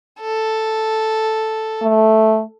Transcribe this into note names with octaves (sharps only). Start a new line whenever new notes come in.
A4
A3